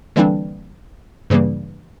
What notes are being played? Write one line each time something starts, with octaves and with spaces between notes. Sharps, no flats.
D3 E3 G3 A#3 C4 D4
G2 C#3 E3 G3 A#3